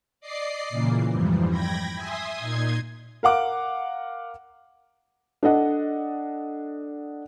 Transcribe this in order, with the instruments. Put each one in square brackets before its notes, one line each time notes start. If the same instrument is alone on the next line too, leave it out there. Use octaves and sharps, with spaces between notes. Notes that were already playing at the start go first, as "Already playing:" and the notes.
[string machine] D5 D#5 D6 C7
A#2 C#3 E3 A#3
F2 G#2 E3 F3 G3
G5 B5 G#6 A#6
E5 G#5 C6 D#6
A#2 D#4 C6 G#6
[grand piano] A#4 F5 F#5 D6
[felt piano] D4 A4 D#5 F#5